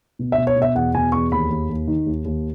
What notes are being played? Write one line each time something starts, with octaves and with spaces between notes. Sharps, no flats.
B2
E5
B2
C#5
B2
E5
E2 F#5
B2 G#5
E2 C#6
D#2 B5
D#2
D#2
D#3
D#2
D#2